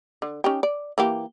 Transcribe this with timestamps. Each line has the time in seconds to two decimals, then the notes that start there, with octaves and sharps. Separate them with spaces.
0.22 D3
0.44 C#4 D#4 G4
0.63 D5
0.98 E3 A#3 G4